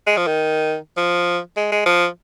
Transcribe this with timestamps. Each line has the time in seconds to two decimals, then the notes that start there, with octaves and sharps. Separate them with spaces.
0.07 G#3
0.17 F3
0.27 D#3
0.97 F3
1.57 G#3
1.72 G#3
1.86 F3